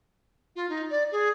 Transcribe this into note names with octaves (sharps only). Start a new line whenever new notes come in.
F4
D#4
D5
G#4